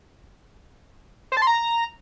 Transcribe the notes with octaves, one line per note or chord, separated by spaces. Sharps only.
C5
A5
C6
A#5